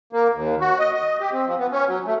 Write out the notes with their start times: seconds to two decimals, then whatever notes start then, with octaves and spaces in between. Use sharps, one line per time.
0.13 A#3
0.34 D#2
0.61 F#4
0.79 D#5
0.94 D#5
1.20 G4
1.32 C4
1.46 F3
1.59 B3
1.72 C#4
1.87 F#3
2.06 A3